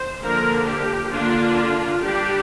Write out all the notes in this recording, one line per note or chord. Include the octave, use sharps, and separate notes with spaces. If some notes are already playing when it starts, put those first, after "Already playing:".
Already playing: C5
D3 F3 A#3 D4 A#4
G4
D3 A#3 D4 F4
G3 D4 G4